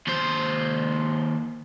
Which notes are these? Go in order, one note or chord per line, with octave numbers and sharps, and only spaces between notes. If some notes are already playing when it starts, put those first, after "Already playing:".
D#2 C5